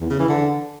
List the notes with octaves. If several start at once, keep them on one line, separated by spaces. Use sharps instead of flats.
E2
C#3
E3
D3